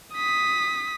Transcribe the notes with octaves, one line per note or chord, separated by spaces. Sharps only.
D#6 B6